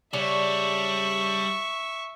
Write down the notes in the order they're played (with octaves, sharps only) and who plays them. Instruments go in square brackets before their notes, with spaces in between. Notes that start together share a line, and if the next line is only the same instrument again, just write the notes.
[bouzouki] C#3 D4 C#5 [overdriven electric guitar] G3 [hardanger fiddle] E5 C#6